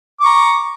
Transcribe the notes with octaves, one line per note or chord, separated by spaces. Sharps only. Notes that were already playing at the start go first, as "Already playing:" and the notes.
A#5 C#6 D6